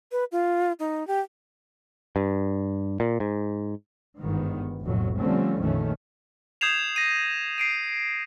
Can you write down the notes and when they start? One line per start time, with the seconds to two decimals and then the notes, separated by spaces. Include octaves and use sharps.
0.12 B4
0.32 F4
0.79 D#4
1.07 G4
2.16 G2
3.00 A#2
3.20 G#2
4.18 G1 G#2 D#3 B3
4.83 F1 B1 F2 A2 F#3
5.17 D3 F3 G3 A3 C4 C#4
5.58 A#1 F2 D#3 E3 A3 C#4
6.61 D#6 G6 G#6 C7 E7 F7
6.96 A#6 D#7
7.58 C7 D7 D#7